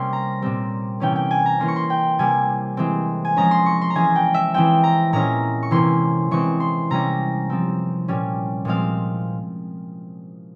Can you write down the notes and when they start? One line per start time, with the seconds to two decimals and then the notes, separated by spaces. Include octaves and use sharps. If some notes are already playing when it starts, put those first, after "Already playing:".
Already playing: C3 G3 A#3 C#4 C6
0.13 A#5
0.42 A#2 G3 C4
1.00 C3 E3 A#3 C#4 G5
1.16 G5
1.31 G#5
1.46 A#5
1.60 E3 A#3 C#4 C6
1.68 C#6
1.76 C6
1.90 G5
2.19 C3 G3 A#3 G#5
2.77 E3 G#3 C4
3.25 G#5
3.36 F3 G#3 C#4 A#5
3.51 C6
3.66 C#6
3.81 C6
3.90 A#5
3.95 E3 G#3 C#4 G#5
4.16 G5
4.34 E5
4.54 E3 G#3 C4 G5
4.84 A#5
5.13 A#2 G#3 C#4 A#5
5.63 C#6
5.71 C3 E3 A#3 C#4 C6
6.31 E3 G#3 C4 C#6
6.60 C6
6.90 C3 G3 C#4 A#5
7.50 F3 C4
8.08 A#2 G3 C#4
8.65 A#2 F3 G#3 C4 F5